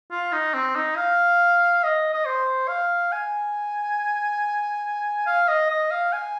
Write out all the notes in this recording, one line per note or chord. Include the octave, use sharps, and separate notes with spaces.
F4
D#4
C4
D#4
F5
D#5
D#5
C5
F5
G#5
F5
D#5
D#5
F5
G#5